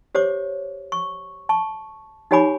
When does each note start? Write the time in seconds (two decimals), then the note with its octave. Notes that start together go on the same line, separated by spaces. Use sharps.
0.15 G4 C5 C#5 D6
0.92 C#6
1.49 A5 C#6
2.31 D#4 G4 C#5 G#5 B5 D6